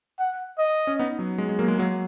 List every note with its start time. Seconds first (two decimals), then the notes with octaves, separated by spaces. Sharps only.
0.19 F#5
0.59 D#5
0.87 C#4
0.99 B3 D#4
1.19 F#3
1.38 G#3
1.49 G#3
1.59 F#3 A#3
1.68 G#3
1.79 F#3 A#3